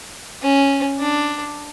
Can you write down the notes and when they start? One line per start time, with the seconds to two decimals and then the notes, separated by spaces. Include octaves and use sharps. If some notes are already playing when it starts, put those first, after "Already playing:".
0.42 C#4
0.99 D4